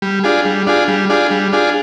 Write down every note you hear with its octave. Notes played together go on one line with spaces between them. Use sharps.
G3
D4 F4 G#4
G3
D4 F4 G#4
G3
D4 F4 G#4
G3
D4 F4 G#4